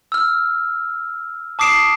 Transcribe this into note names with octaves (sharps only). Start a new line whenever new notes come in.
E6 F6
A5 D6 D#6 C7 D7 E7